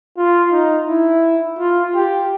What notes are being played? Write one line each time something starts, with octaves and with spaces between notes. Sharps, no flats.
F4
D#4
E4
F4
G4